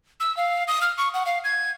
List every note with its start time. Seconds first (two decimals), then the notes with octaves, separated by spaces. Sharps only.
0.20 E6
0.37 F5
0.68 D#6
0.82 F6
0.98 C#6
1.14 F#5
1.26 F5
1.44 G#6